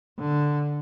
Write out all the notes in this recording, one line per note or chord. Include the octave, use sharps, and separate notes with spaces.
D3